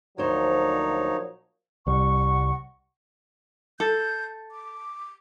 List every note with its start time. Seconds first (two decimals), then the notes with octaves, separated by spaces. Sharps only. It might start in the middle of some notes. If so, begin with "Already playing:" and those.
0.18 D2 A#2 F3 F#3 D#4 C5 C#5
1.87 C2 G3 F#5 C#6
3.80 A4 G6
4.51 D6